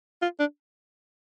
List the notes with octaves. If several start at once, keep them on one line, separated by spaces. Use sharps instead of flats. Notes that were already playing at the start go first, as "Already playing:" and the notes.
F4
D4